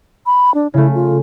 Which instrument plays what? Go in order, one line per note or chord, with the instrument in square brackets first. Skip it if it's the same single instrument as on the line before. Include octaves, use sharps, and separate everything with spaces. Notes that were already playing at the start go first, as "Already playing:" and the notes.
[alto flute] B5
D4
[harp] C#3 A3 [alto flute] E4
[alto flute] F4